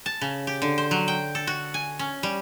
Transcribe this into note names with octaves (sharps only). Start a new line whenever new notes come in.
A5
C#3
G4
D3
C5
F#3
G5
A4
F#4
G#5
C#4
G3